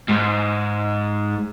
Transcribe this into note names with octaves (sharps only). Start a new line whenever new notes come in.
G#2